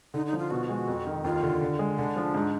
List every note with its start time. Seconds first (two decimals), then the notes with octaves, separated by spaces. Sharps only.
0.14 D3 D#4
0.26 D#4
0.33 F3
0.39 F4
0.50 B2 F#4
0.69 G#3
0.88 F2
1.07 D#3
1.24 D#2 F4
1.43 D3
1.61 D3
1.79 G#3
1.98 D3 D4
2.16 F3
2.34 G#2